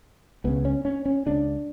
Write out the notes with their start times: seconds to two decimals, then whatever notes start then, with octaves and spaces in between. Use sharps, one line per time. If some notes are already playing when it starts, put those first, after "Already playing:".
0.44 C#2 C#3 B3
0.65 C#4
0.85 C#4
1.06 C#4
1.26 C#2 C#3 D4